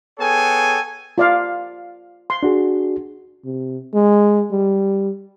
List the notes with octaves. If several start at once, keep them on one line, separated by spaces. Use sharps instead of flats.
B3 G#4 A4 C#5 G5 G#5
F4 D5 F5
C6
D4 F#4 G#4
C3
G#3
G3